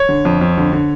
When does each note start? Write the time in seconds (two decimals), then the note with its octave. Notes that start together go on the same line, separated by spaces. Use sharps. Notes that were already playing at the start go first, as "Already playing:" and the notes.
Already playing: C#5
0.09 D3
0.25 F2
0.41 F2
0.58 D3
0.72 D3